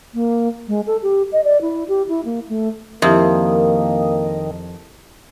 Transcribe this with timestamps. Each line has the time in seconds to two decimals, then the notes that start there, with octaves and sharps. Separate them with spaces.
0.14 A#3
0.68 G#3
0.87 A4
1.03 G4
1.32 D#5
1.44 D5
1.62 E4
1.88 G4
2.09 E4
2.25 A#3
2.49 A3
3.02 F2 D#3 A#3 E4 G4 E5